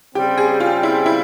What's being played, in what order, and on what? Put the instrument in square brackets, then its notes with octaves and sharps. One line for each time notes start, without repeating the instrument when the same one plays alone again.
[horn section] C#3 G3 C4 [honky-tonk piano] G4
[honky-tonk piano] G#4
F4
E4
E4